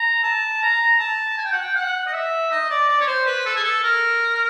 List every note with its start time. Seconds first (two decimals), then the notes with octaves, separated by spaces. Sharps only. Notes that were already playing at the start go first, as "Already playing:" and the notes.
Already playing: A#5
0.23 A5
0.62 A#5
1.00 A5
1.38 G#5
1.45 G5
1.53 F#5
1.61 G5
1.75 F#5
2.07 D#5
2.13 E5
2.51 D#5
2.70 D5
2.89 D5
3.01 C#5
3.08 C5
3.26 B4
3.46 A4
3.56 G#4
3.64 A4
3.84 A#4